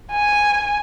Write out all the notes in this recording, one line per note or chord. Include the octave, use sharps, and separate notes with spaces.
G#5